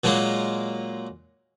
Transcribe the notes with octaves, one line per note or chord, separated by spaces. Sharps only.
A#2 F#3 G#3 A#3